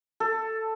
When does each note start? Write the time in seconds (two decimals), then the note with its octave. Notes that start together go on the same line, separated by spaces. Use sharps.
0.20 A4